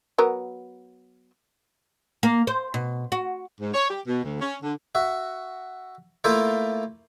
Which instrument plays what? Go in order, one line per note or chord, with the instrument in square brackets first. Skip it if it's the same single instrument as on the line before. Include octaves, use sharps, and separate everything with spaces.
[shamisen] F#3 B3 A#4
[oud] A#3
C5
B2
F#4
[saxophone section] G#2
C#5
G4
B2
D2
C#4
D3
[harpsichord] F#4 E5
A3 A#3 E4 F4 C5 E5